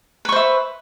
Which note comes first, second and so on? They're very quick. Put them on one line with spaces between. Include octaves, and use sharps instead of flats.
B4 C#6 C5 E5